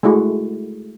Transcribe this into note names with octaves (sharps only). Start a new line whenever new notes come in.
G#3 A3 E4 F#4